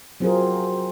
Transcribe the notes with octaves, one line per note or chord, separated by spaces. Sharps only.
F#3 C4 F4 G#4 A#4